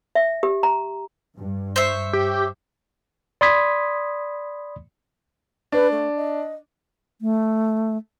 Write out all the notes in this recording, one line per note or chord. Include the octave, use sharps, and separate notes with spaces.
E5
G4
A#5
G2
C5 C#5 E5
G4
D5 B5 C6 D#6 G#6 B6
D4 B4
A3
D#5
A3